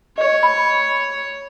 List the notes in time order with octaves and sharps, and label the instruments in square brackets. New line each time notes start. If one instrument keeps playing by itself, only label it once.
[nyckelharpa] C#5 [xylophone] D#5
[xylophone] B5